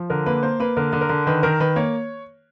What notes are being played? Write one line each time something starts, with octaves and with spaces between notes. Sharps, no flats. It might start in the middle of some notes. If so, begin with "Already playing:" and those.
Already playing: F3
D3 A#4
A#3 B4
A#3 C5
A#3 B4
D3 A#4
D3
A#4
D3
D#3 B4
D#3 A#4
D#3 B4
A#3 C#5